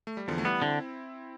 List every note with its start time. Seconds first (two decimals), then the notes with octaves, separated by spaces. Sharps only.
0.07 A3
0.17 G3
0.28 E2 D3 F3
0.38 A3
0.45 E3 G3 B3
0.62 D3 C4 E4